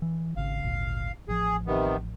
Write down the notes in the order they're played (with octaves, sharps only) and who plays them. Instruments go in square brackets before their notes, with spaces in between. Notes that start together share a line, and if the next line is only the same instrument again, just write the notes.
[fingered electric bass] E3
[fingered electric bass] G#1 C#3 [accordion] F5
[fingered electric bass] G#1 D2 A#2
[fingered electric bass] A1 F3 [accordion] G#4
[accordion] C3 D#3 B3